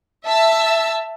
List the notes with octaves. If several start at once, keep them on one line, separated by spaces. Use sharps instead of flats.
E5 A5 E6